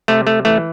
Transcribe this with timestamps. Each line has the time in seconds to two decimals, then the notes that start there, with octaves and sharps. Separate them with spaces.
0.08 C3 A3
0.27 A3
0.45 E3 A3